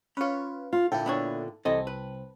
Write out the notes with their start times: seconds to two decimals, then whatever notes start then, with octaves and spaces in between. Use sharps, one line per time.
0.17 C#4 F4 B4 C#5
0.73 F4
0.92 A#2 D3 E4 A4 G5
1.06 B3 D4 C#5
1.65 C2 E3 C4 A4 D#5 A5
1.87 B4